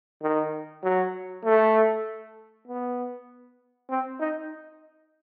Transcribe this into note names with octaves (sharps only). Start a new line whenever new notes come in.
D#3
F#3
A3
B3
C4
D#4